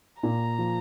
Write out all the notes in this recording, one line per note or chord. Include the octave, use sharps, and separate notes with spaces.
A#2 A#5
F3